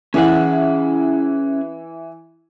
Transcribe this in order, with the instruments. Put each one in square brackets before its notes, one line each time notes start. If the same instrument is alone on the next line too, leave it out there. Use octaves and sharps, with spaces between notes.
[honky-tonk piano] E3 E4 [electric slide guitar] C#4 G#4 F#5